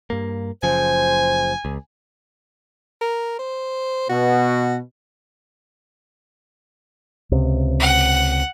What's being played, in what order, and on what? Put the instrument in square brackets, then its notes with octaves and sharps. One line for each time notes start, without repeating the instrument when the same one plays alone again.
[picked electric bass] G2 A#3
[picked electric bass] F#1 C#3 F3 [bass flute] C5 [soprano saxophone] G#5
[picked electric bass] C#2
[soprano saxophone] A#4
C5
[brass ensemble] B2 [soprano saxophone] F#4
[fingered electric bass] C#2 C3
[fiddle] F#5